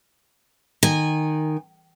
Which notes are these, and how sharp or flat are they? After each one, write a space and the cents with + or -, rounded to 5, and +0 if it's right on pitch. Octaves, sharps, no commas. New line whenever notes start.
D#3 -10 G#5 -20